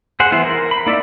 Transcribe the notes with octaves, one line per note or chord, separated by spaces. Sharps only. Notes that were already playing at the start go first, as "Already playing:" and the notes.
G#4 C5 F#5
E3 B3 E4 C5
A#4
B5
A#3 D#4 E4 D5 E5